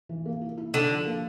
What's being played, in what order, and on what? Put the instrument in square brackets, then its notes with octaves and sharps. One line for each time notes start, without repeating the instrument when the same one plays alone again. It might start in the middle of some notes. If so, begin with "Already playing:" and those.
[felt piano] E3
A#3
E4
E4
[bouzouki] D3 [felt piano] D4
[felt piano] F3
A#3